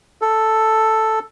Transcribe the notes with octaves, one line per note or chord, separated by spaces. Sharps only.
A4